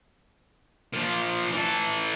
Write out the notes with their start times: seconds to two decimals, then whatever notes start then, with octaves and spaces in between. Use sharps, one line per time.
0.93 A#2 F3
1.53 E3 A4